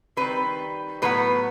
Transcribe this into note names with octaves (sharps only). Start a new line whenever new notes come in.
D#3 G3 C4 B4
A2 F#3 B3 B4